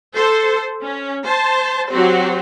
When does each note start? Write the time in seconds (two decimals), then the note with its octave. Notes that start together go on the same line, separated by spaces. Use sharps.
0.15 A4 C5
0.83 C#4
1.25 C5 A5
1.90 F#3 C4 F#4 G4 C5